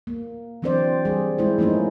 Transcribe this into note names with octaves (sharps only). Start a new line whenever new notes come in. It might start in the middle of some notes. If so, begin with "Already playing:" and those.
A#3
E3 F#3 C4 D4 C5 D5
G3 G#4
G#3 E4 C5
F3 A3 A#3 C#4 D#4